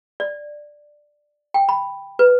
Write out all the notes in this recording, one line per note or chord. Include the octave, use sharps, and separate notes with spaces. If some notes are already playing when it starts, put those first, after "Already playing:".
D5
G5
B5
B4